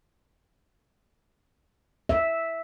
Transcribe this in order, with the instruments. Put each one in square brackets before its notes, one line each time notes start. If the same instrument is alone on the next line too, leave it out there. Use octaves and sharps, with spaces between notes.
[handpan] E5